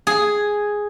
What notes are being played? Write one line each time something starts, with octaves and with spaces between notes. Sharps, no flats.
G#4